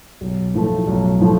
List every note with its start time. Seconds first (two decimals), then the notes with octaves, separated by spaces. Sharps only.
0.21 B1
0.54 A2 F3 A3
0.87 B1
1.20 A2 F3 A3